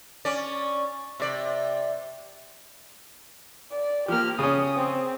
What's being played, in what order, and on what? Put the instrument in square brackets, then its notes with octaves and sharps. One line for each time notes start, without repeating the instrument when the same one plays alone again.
[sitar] C#4 D5
C3 D5
[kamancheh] D5
[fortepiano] F3 A#3 [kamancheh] G4 F6
[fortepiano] C#3 C#4 [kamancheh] D#6
[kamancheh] C4